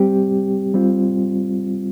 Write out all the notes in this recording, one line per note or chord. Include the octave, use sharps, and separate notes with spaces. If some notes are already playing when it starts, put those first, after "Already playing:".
Already playing: G3 C4 G4
G3 C4 F4